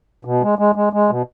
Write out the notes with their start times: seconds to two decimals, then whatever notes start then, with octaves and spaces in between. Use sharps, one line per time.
0.25 B2
0.42 G#3
0.59 G#3
0.75 G#3
0.93 G#3
1.10 B2